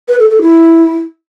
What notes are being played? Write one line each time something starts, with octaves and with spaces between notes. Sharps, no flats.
B4
A4
A4
E4